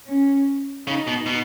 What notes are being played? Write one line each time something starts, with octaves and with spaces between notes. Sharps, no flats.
C#4
C#3 D#4
B2
B2